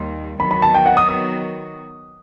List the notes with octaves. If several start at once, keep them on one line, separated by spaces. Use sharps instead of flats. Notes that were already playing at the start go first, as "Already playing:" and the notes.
Already playing: D#2 D#3 G3 C6
D#3 F#3 B3 F#4 B5
B5
A5
G5
F#5
D#6
D#6